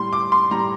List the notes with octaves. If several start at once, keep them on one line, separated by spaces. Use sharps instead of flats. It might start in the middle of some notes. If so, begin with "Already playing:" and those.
Already playing: A2 G3 C6
D6
C6
A2 G3 A#5